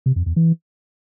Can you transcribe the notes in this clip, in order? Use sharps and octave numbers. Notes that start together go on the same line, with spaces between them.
C3
F2
E2
E3